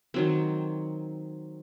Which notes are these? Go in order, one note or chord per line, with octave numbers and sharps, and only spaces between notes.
D#3 F#3 C4